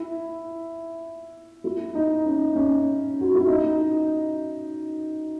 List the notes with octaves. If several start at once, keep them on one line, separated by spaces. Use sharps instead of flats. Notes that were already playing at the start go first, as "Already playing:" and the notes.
Already playing: E4
E4
D#4
C#4
C#4
F#4
E4
D#4